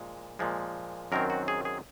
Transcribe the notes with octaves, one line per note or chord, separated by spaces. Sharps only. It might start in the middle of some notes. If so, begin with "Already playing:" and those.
Already playing: A#2 F3 G#3
A#2 F3 G#3
F#2 D#3 F#3 C4 A#4
F#4
G#4
G#4